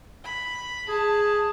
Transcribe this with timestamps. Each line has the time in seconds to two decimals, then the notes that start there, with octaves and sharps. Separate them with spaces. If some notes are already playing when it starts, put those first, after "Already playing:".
0.24 B5
0.88 G#4 A5